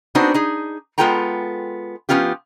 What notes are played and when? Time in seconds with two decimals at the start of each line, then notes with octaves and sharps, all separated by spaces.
0.15 B3 C4 D4 D#4 F#4 C5
0.34 D#4 G#4
0.98 G#3 B3 F4 A4 G5 A#5
2.09 F3 B3 C#4 F4 G4